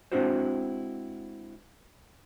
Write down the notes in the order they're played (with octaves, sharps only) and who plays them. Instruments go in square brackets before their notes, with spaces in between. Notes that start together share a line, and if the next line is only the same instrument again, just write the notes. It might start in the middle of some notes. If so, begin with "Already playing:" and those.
[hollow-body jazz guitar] G#3 C4 D4 E4 F#4 C5